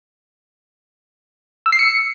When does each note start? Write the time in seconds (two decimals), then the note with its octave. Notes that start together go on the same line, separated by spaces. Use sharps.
1.66 E6
1.72 C7
1.79 C#7